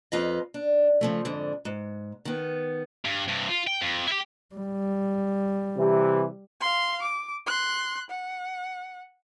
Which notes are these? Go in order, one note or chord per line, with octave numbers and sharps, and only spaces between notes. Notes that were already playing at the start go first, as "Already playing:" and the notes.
F2 F4 B4 D#5
D4
C#3 F3 A3
F2 G#2 D3
G#2
D#3 B3
G2
G2 C3
F4
G5
F2
E4 G4
G3
C3 E3
F5 C6
D6
C6 F#6
F#5